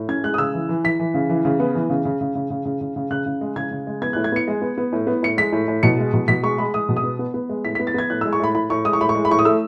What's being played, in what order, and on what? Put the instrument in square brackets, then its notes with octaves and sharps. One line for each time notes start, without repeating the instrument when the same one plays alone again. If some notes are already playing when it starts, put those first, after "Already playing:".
Already playing: [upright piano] A2
C#4 G#6
G#3 F#6
D#6
C#3 E6
E3
E3
E3 B6
E3
C#3
E3
C#3
B3
E3
C#3
C#3
C#3
C#3
C#3
C#3
C#3
C#3
C#3 F#6
C#3
G#3
C#3 G#6
C#3
G#3
B3 G#6
A2 F#6
G#6
B3 C#7
G#3
B3
B3
A2
B3
A2 C#7
G#3 B6
A2
A2
B2 C#7
G#3
B2
B2 B6
G#3 C#6
G#3 B5
G#3 D#6
B2
D#6
B3
B3
B3
G#3
A2 B6
B3 B6
A6
B3 G#6
A2 F#6
G#3 E6
C#6
A2 B5
A2 B5
A2 C#6
G#3 D#6
C#6
A2 B5
C#6
G#3
B5
A2 C#6
D#6
A3 E6